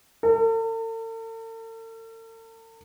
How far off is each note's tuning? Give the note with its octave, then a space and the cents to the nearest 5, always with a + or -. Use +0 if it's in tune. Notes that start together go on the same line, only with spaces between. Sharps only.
A4 +45